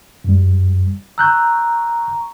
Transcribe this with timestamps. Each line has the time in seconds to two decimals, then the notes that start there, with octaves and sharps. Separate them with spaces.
0.24 F#2 G3
1.18 A#5 C#6 E6 F#6 G6